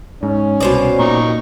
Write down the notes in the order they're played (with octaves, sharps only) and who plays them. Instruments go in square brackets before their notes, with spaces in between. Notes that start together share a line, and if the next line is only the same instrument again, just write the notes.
[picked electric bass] G#2 [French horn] C#4
[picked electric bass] C2 [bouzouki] B2 C5 D5
[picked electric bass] A#2 [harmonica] D#4 A#5 C#6